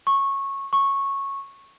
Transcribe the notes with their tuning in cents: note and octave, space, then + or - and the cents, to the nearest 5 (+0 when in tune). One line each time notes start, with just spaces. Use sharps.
C#6 -15
C#6 -10